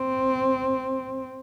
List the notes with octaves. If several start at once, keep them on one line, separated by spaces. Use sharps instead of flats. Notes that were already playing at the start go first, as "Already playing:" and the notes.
Already playing: C4